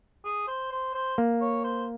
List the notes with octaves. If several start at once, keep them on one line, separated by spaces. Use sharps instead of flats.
G#4
C5
C5
C5
A#3
C#5
C5